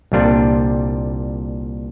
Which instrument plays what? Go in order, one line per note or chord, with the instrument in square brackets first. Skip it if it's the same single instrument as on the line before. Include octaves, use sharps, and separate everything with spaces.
[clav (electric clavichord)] C2 A#2 G3 D4 F4